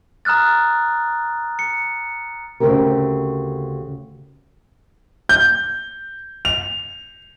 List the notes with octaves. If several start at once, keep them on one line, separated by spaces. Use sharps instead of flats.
A#5 D#6 F6 F#6 A6
C#7
D2 C#3 F3 C4 G4 A#4
G6
F7